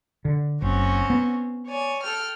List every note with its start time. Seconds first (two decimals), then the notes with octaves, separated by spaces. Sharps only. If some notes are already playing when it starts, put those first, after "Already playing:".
0.25 D3
0.62 F#1 C4 C#4 F#4
1.10 B3
1.65 C#5 D5 G#5
2.02 A4 G5 F6